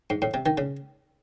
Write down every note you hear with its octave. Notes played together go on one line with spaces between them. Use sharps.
G#2
A2
C3
D#3
C#3